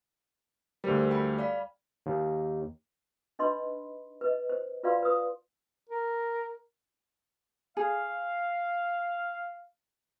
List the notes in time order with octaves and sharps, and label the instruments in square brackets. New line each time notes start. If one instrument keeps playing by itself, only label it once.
[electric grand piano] D2 G3 [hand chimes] A#4 C5
[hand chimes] G5 B5
D5 F5 B5
[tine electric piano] D#2
[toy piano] D4 D#4 B4 D#5 B5 C6
B4 D#5
C5
F4 B4 D5 F5 C6
B4 D#6
[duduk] A#4
[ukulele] G#4 [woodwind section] F5